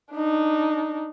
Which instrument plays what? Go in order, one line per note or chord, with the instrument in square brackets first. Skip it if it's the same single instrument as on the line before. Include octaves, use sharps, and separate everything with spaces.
[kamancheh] D4 D#4